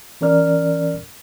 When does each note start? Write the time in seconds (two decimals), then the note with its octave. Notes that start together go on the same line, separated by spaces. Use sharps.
0.21 E3 C#4 A#4 D5 F6